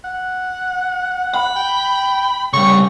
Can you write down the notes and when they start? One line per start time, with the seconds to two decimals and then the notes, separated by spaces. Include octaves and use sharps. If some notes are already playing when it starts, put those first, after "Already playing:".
0.04 F#5
1.34 B5
1.56 G5
2.53 C#3 G3 C#6